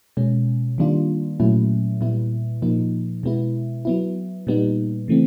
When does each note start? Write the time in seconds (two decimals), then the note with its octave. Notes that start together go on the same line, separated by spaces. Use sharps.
0.17 B2 G#3 C#4
0.78 D#3 G3 A#3 D4 F4
1.40 A#2 F#3 A3 C#4 E4
2.01 A#2 G3 B3 E4
2.62 A#2 F3 A#3 D#4
3.23 B2 G#3 B3 E4
3.85 F#3 B3 E4
4.47 A#2 G3 B3 D#4
5.08 C#3 E3 A3 C4